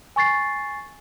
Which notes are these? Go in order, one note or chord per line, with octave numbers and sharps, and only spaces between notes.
G#5 C#6 A6 C7